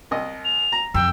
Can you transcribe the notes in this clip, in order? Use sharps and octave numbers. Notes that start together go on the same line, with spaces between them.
C2 D#5
F7
A#5
F2 G5 E6